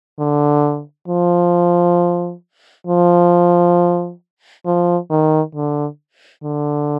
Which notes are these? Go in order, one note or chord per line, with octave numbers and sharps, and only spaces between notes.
D3
F3
F3
F3
D#3
D3
D3